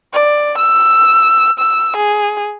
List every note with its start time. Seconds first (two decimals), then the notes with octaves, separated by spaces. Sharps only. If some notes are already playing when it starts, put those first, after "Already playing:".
0.13 D5
0.58 E6
1.59 E6
1.96 G#4